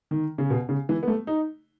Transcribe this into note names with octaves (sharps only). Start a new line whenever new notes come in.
D#3
C#3
B2
C#3
E3
B3
A3
D#4